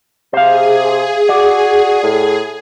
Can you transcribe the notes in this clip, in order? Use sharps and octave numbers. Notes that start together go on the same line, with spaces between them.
C3 G#4 C5 F5
F#4 D5
A2